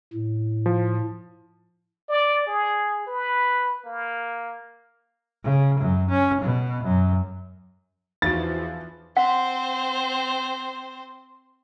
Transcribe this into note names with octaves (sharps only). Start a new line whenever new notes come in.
A2
F3
D5
G#4
B4
A#3
C#3
F#2
C#4
B2
F#2
E2 E3 F3 D#4 F#4 A6
C4 C5 F#5